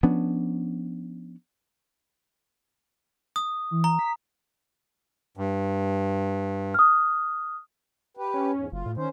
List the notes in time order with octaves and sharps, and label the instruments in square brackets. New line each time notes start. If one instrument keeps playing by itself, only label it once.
[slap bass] F3 B3 C#4 D4
[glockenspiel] D#6
[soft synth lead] E3
[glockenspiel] A#5
[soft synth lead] B6
[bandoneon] G2
[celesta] D#6 F6
[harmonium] G4 B4
[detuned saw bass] C#4
[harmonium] E2 G#2
[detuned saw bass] F#1 [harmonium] F4
[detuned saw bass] A2
[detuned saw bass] D#3 [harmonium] C#4 C5